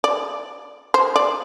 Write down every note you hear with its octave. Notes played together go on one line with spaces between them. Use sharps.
D5
C5
D5